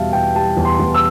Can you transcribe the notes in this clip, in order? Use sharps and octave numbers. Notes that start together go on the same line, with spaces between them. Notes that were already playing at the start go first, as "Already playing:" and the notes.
Already playing: E2 B2 G3 E5 F5 A5
B2 G5
G3 A5
E2
C6
E2
E6